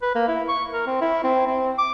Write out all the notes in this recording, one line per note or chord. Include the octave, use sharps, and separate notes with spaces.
B4
A#3
E4
C#6
A#4
C4
E4
C4
C4
D6